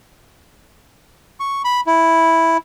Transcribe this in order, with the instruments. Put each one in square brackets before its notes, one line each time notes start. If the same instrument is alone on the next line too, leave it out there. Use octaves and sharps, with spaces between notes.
[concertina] C#6
B5
E4